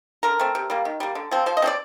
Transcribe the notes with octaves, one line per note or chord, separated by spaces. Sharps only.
D3 A#4
A3 C4
C3
G3 A#3
D#3
G3 A#3
D3
F3 C4
F3 C5
D#5
A3 C4
D5